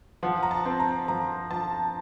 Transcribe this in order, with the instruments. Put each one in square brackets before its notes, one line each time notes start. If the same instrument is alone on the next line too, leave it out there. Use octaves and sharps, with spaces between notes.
[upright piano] F3 F#5
A#5
A5
C4
A#5
F3 A#5
F3 A5